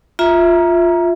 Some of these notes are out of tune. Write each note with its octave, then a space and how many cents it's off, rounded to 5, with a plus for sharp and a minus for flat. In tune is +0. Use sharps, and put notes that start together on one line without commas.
F4 +5 E5 -5 A#5 +15